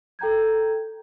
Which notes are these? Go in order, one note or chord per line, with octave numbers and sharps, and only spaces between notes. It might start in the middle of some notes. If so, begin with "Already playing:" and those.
A4 G5 A#5 G6 G#6